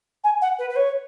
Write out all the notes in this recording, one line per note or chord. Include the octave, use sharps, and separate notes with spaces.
G#5
F#5
B4
B4
C#5